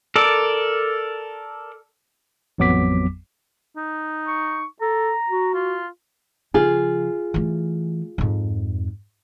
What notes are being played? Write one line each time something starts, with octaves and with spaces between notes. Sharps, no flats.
A4 A#4 D5
A1 F2 F#3 B3 D6 B6
D#4
C#6
A4 A#5
F#4
F4
C#3 F3 F4 G#4
E3 A3
F2 G#2